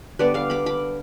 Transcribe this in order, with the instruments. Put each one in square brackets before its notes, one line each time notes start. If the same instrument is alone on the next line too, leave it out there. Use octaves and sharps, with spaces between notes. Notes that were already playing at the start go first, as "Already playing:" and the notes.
[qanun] D3 G3 B3 D4 B4 D5
D5 F5
B5 D6
B5 D6